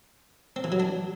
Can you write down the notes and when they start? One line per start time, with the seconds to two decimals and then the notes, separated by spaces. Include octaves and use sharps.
0.56 C4
0.64 E3
0.72 F#3
0.80 D4